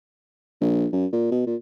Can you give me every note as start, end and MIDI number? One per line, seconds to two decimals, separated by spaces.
0.61 0.87 34
0.92 1.06 42
1.12 1.28 46
1.31 1.43 47
1.46 1.56 46